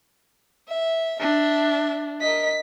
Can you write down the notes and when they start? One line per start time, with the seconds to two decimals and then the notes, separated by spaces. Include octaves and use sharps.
0.68 E5
1.20 D4 E5
2.21 A#4 D#5 B6